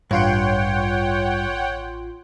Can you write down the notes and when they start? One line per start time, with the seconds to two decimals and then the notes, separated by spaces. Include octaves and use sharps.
0.11 A1 G2 F4 C#5 F#5 G5 C6